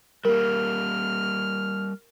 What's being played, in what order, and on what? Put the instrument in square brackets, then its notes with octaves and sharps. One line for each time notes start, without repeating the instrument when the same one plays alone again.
[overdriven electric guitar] G3 A#3 [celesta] A#4 [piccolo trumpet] F6